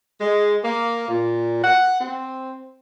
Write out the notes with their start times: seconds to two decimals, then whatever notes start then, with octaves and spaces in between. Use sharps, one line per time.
0.19 G#3
0.64 A#3
1.08 A#2
1.63 F#5
2.00 C4